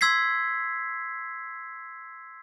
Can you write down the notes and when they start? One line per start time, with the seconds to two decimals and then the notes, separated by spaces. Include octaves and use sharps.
0.01 C6 E6 G#6 B6 C7